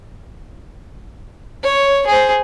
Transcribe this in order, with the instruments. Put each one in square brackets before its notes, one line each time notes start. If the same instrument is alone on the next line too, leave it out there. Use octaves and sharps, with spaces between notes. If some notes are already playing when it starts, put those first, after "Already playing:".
[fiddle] C#5
G#4 C5